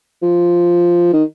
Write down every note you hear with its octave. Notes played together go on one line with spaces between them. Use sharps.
F3
D#3